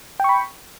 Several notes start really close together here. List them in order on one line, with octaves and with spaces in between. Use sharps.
G5 C#6 B5